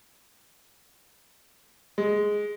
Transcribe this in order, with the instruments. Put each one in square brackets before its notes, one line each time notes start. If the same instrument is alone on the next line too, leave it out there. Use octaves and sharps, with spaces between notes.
[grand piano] G#3